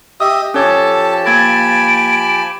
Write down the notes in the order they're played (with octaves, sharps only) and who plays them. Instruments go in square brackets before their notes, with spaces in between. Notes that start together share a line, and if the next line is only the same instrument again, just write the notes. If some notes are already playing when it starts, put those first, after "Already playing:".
[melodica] G4 D#5 E5 [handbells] D#6
[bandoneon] F3 G4 A5 [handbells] C#4 C#5 [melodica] A4
[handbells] A#3 G#6 A6 [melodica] G#5 B5 [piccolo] D7